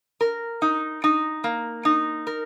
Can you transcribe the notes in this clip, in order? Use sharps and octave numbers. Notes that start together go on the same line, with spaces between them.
A#4
D#4
D#4
A#3
D#4
A#4